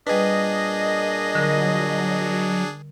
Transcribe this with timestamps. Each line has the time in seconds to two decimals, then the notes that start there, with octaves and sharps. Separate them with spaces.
0.07 A#2 G3 D4 G#4 B4 D#5
1.35 D3 F#3 A#4